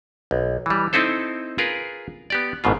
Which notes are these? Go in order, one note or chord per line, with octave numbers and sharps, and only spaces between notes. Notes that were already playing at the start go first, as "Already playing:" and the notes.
B1
E3 G3
C4 D#4 E4 A4 C5
F4 G#4 A#4 B4
B3 G4 D5
G#1 G#2 B2 F4